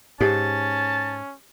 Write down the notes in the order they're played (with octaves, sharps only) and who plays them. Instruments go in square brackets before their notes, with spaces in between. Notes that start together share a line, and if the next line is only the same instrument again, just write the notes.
[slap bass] G#2 [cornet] C#4 [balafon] G4 [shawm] A5